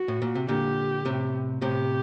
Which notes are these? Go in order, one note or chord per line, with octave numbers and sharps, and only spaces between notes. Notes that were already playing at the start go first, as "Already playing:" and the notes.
Already playing: F#4
A2
A#2
C3
A#2 D3 G4
A2 C3
A2 C3 G4